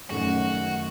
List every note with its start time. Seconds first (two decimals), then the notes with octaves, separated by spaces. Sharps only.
0.10 F#2 D#3 A3 C#4 F#4